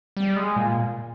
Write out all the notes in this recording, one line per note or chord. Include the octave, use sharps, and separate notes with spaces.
G3
G#3
A#2